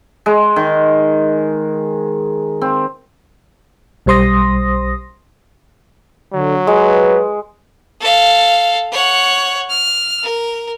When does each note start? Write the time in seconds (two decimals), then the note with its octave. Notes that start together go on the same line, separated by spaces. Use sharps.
0.26 G#3
0.56 D#3
2.61 C4
4.06 B1 G3 C5 C6 D#6 A#6
6.33 D3 F#3
6.67 G#3 B4
8.01 A4 F5
8.92 C#5 F#5
9.70 F6
10.23 A#4